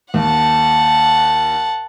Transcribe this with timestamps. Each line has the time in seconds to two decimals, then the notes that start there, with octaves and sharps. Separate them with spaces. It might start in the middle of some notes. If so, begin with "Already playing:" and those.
0.14 D#2 F#5 A5